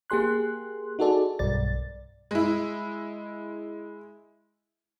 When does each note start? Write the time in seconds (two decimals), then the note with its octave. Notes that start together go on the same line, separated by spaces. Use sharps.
0.10 A#3 G4 G#4 C6 F#6
0.99 D#4 F#4 G#4 A4 D5
1.39 B1 G2 D5 A6
2.31 G#3 E4